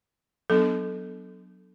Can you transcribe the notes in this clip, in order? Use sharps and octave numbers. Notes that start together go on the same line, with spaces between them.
F#3 B3 D4 A4